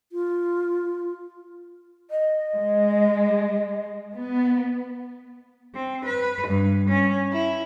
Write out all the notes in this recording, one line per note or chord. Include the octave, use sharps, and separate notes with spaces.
F4
D#5
G#3
B3
C4
B4
G2
C#4
E4